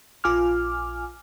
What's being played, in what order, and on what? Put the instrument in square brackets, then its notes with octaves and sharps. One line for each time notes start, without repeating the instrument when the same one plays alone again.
[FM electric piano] A#1 F4 G#5 D6 F6